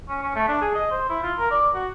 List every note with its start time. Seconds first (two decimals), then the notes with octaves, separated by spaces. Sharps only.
0.08 C#4
0.23 C#4
0.35 A3
0.48 D4
0.61 G#4
0.75 D#5
0.91 C5
1.09 E4
1.23 F4
1.39 A#4
1.51 D5
1.74 F#4